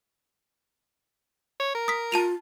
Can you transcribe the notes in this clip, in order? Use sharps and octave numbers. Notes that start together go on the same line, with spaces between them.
C#5
A#4
D#6 B6
F4 A5 D#7 F7